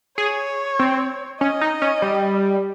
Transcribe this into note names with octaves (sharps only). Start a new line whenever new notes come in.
G#4 C#5
C4
C#4 D#5
D#4
C#4
G3